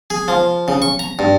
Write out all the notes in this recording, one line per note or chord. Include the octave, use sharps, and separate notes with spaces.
G#4
F3
C#3
C#6
A#5
G2